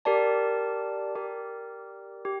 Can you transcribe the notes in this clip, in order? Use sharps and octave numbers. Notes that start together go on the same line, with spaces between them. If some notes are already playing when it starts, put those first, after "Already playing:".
G4 A#4 D5 A5
G4 A#4 D5
G4